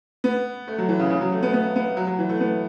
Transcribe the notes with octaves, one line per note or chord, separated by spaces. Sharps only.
B3
A3
F#3
E3
C#3
C#3
F#3
A3
B3
B3
B3
F#3
F#3
E3
A3
B3